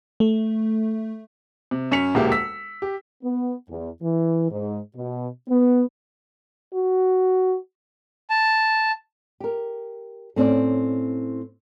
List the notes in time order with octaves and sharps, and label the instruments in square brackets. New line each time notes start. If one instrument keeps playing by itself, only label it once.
[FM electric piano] A3
[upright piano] C3
F#2 C#4 B6 C#7 F7
E1 D2 G#3 A#3 E4 G4
E6 B6
G4
[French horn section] B3
E2
E3
G#2
B2
B3
[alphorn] F#4
[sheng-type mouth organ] A5
[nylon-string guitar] G4 A#4
A2 C4 C#4 D5